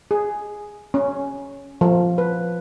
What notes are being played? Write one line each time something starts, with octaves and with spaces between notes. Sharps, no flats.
G#4
C#4
F3
B4